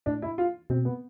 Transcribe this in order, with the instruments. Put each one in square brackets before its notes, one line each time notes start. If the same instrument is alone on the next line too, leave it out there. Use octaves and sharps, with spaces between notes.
[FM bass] A2 [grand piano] D4
[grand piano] E4
F4
[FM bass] B2 [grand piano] C4
[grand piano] B3